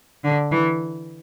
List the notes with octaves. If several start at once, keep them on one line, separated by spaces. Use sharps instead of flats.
D3
E3